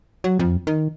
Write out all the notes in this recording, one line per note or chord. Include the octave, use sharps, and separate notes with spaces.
F#3
F2
D#3